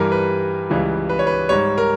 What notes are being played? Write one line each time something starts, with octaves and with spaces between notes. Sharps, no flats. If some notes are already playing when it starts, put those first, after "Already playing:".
Already playing: G2 E3 G3 A#4
B4
C#2 C#3 E3 G3
B4
C#5
B4
G#2 G3 C#5
A#4